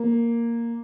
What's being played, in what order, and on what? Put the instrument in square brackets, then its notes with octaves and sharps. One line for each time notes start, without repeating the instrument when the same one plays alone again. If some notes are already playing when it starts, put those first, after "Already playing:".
Already playing: [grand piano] A#3